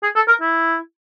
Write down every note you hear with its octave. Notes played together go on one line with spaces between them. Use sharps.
G#4
A4
A#4
E4